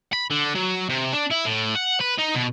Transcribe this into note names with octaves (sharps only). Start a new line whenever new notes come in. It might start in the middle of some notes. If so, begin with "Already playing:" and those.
B5
D3
F#3
C3
D4
E4
A2
F#5
B4
D#4
B2